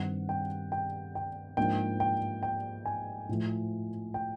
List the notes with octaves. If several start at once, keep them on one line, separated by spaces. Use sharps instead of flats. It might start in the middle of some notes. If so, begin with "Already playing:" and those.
Already playing: G2 D#3 G3 C4 F#5
G5
G5
G5
G#2 F3 A#3 D4 G5
G5
G5
G#5
A2 F3 A3
G5